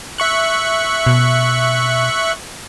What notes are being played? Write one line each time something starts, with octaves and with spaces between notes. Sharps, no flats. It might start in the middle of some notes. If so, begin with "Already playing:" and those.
E5 C#6 F#6
B2